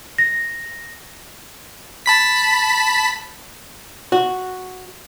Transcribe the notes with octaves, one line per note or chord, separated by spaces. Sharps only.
A#6
A5 B5 B6
F#4